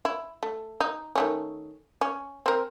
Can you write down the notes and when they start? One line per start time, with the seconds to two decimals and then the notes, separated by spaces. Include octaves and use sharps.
0.05 E4
0.43 A3
0.80 D#4
1.15 D#3 A3 C#4
2.01 C#4
2.46 C4 A#4